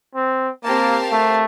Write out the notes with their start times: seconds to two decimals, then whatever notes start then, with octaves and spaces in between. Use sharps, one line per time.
0.15 C4
0.63 A#3 C4 G4 A#4 F5 A5
1.12 A3